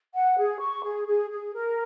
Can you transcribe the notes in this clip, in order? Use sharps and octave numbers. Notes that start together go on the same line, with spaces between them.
F#5
G#4
C#6
G#4
G#4
G#4
A#4